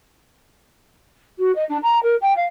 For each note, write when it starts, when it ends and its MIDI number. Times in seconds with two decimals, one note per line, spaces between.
1.38 1.54 66
1.55 1.64 75
1.69 1.77 62
1.82 2.01 82
2.03 2.15 70
2.21 2.35 79
2.36 2.46 77